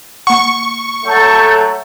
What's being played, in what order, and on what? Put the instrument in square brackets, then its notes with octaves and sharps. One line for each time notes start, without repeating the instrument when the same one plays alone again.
[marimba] A#3 F#5 [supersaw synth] C#6
[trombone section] F#3 A3 [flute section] A4 G6